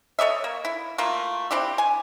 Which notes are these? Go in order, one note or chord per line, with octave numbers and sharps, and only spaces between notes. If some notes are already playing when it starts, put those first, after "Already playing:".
A4 C#5 D#5 E5
A#3
E4
A3 A#3 F4
C4 D4 E4 G4
G#5